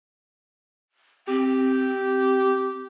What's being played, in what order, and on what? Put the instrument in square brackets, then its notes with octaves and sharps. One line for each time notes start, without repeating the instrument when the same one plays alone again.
[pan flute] C4 [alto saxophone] G4